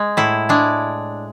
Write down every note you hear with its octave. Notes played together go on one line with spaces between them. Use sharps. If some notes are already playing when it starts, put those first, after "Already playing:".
Already playing: G#3
A2 E4
G#3 D4